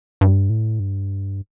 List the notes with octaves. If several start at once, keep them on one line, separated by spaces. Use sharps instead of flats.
G2
A2
G2